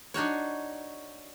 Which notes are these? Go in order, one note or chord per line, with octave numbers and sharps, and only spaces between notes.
D4 D#4 F#4 C#5